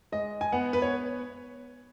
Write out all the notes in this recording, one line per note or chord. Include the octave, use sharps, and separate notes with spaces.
G#3 D#5
G#5
B3 F#5
B4
C#5